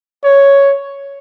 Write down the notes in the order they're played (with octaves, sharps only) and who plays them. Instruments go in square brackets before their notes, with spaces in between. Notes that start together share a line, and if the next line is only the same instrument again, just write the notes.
[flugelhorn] C#5